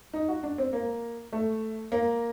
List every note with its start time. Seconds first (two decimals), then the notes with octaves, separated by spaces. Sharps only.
0.14 D#4
0.29 F#4
0.43 D4
0.58 C4
0.73 A#3
1.33 A3
1.92 A#3